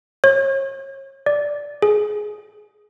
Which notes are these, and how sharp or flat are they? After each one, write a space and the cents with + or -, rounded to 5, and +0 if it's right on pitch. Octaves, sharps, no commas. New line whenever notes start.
C#5 -30
D5 -5
G#4 +15